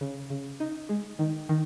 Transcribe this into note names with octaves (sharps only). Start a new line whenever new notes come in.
C#3
C#3
D#4
G#3
D#3
D#3